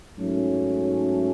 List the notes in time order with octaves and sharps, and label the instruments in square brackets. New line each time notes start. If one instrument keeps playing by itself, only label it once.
[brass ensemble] G#2 F#3 A3 C#4